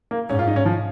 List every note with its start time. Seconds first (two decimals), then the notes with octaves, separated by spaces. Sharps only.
0.11 A#3
0.29 G#2 C#4
0.39 F4
0.47 D#4
0.56 C#4
0.66 F3